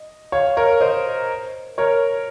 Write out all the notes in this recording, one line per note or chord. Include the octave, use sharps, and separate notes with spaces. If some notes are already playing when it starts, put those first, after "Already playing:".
Already playing: D#5
C#5 F5
A#4 C#5
C5 D#5
A#4 C#5